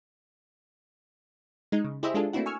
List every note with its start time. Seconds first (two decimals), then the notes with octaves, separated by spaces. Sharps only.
1.72 G#3 D#4
1.84 C#3
2.03 E4 G4 G#4 C5 D#5 E5
2.14 G#3 D4 F4 G#4 A4
2.33 A3 A#3 C4 D4 E4 F#4
2.46 G#5 C#6 E6 F6